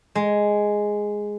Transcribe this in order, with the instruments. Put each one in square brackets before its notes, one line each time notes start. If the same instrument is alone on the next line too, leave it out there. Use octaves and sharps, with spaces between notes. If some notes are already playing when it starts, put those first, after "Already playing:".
[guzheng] G#3